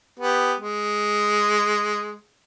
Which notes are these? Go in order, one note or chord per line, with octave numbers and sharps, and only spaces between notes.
B3 G4
G#3